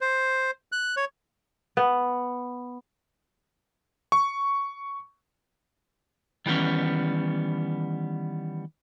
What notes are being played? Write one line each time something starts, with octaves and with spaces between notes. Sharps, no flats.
C5
F#6
C#5
B3
C#6
D#3 E3 G3 B3 C#4